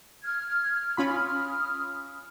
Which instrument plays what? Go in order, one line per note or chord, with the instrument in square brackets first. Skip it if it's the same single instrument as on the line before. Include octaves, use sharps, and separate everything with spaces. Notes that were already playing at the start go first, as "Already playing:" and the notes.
[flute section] F6 G#6
[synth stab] C#4 F4 B5 [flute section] D#6 F6